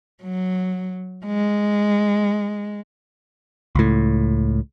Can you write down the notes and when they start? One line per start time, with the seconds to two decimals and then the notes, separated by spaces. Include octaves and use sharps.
0.23 F#3
1.25 G#3
3.75 C#2 A2